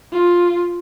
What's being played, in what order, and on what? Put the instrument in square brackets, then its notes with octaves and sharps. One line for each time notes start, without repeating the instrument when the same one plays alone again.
[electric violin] F4